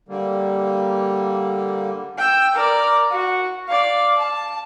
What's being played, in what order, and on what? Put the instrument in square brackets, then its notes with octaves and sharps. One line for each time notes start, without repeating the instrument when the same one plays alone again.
[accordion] D3 G3 A#3
[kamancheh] G5 E6
A#4 D5
F#4
D5 F5
A5